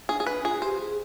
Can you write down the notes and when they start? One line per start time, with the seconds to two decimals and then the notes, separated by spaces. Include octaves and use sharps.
0.09 D4 G#4
0.20 G#4
0.27 D4 B4
0.44 F4 G#4
0.58 G#4
0.62 G4 C5
0.80 G#4